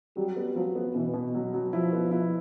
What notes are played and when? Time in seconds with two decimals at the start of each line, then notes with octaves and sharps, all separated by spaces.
0.17 F#3 G3
0.37 B3
0.55 F3 F#3
0.75 B3
0.95 B2 E3
1.14 B2
1.34 F#3
1.53 F#3
1.73 F3 E4
1.93 B3
2.11 E4